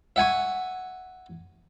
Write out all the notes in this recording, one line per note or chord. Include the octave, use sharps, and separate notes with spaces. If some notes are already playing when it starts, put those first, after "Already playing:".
E5 F#5 G#5 C#6